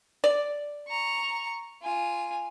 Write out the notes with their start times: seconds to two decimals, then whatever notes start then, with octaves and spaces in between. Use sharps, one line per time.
0.24 D5
0.88 A#5 C#6
1.83 F4 G#5